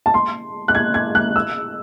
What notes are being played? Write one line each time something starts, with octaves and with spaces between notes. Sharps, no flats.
A5
C6
F#6
G#6
G#6
F#6
E6